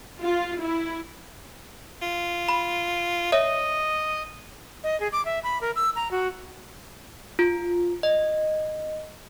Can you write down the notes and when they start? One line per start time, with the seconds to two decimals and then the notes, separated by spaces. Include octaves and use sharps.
0.22 F4
0.61 E4
2.02 F4
2.49 B5
3.32 C#5 D#5 E5
4.84 D#5
5.00 G#4
5.13 D6
5.25 E5
5.44 B5
5.61 A#4
5.76 E6
5.96 A#5
6.11 F#4
7.39 F4
8.03 D#5